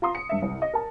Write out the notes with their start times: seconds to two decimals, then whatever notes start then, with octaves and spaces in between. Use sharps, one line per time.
0.02 F4 A#5 C6 D#6
0.15 C#7
0.29 G2 E5
0.42 C2
0.62 D#5
0.74 A#4 A5